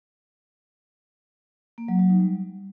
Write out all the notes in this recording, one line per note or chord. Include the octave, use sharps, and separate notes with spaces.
A#3
F#3
F#3
D#4
G3